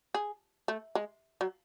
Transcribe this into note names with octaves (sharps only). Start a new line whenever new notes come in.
G#4
A3
G#3
F#3